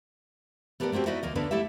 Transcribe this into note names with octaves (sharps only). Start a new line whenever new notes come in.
A3 B3 G4 G#4 A#4 D5
A3 A#3 C4 F#4 G4
D#4 E4 F#4 B4 D5 D#5
D2 A#3 D#5
D3 A#3 B3 D4 A4 B4
A3 E4 G4 A4 E5